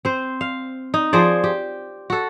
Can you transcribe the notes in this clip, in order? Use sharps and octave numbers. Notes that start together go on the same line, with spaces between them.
C4 C5
F5
D#4
F3 G#4 C5 D5
G4
F#4 A4